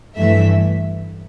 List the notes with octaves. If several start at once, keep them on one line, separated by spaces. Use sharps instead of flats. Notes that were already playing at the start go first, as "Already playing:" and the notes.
G2 E3 A3 E5